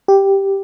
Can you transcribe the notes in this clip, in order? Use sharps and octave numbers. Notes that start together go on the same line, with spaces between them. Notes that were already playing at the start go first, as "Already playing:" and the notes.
G4